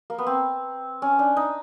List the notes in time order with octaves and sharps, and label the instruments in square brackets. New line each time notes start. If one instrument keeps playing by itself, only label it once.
[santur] A#3
B3
C4
C#4
D4
D#4